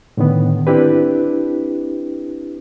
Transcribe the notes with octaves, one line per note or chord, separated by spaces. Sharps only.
A2 D3 D#3 B3
C4 D4 E4 G4 B4